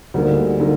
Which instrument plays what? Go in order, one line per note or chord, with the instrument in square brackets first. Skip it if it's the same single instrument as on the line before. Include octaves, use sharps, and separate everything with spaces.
[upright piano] D2 D3 G3 A#3 D#4
D3 G3 A#3 D#4